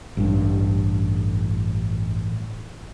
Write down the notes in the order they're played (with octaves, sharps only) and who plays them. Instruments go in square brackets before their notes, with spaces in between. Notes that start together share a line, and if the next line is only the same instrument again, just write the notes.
[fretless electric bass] A1 G2